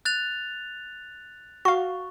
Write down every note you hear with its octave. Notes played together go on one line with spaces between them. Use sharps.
F#6 A6 F7
F#4 F5 C#6